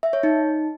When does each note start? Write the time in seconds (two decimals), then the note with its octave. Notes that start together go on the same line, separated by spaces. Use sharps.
0.03 E5
0.13 C#5
0.23 D#4